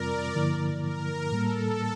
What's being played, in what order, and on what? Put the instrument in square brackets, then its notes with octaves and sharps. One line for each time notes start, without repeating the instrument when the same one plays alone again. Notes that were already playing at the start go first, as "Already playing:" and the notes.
Already playing: [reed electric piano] F2 C3 G3 C4 F4 [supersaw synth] A#4 D5
[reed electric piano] G2 D3 F3 A#3 E4
[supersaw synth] A#4
[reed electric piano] A2 G3 A#3 [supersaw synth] A4